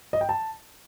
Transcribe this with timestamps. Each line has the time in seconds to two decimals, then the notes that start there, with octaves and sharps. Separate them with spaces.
0.13 D#5
0.21 G5
0.29 A5